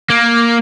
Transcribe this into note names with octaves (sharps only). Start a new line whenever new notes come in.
A#3